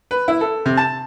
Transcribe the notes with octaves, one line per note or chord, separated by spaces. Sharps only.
B4
E4
A4
C3
A5